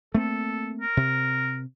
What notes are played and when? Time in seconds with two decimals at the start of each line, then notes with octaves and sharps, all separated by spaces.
0.15 A3 A#3 C4 A4
0.81 A#4
0.97 C3